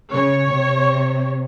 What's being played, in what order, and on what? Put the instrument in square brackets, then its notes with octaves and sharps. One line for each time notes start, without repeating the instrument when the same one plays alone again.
[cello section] C#3 [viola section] C#5
[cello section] C3